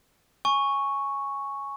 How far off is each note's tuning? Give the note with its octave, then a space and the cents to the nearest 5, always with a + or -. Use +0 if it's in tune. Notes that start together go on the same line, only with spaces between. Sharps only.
G#5 +0 C#6 +0